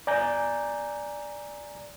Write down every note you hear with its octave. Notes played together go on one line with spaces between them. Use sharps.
D5 G#5 A#5 G6